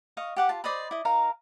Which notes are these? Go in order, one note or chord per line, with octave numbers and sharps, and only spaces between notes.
D#5 F5 C#6
G4 F#5 D6
F4 A5
C5 D5 D#5 B5
E4 D#5
D#4 A#4 F5 A#5